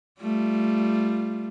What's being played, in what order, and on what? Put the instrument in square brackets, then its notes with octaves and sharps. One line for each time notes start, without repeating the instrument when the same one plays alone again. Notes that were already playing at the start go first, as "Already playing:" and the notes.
[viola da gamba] G3 A3 F4